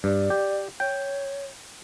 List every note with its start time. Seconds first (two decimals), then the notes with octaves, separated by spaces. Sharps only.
0.04 G2 D5
0.30 G4
0.80 C#5 G5